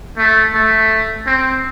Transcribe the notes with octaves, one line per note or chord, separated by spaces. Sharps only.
A3
A3
C4